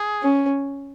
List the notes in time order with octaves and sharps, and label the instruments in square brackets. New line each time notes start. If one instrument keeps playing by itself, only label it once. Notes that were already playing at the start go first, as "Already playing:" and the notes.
Already playing: [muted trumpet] G#4
[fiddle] C#4